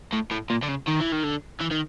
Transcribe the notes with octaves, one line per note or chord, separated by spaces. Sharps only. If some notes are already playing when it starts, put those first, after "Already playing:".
A2
A2
A#2
D3
C#3
D#3
E3
D#3
D3
E3
D#3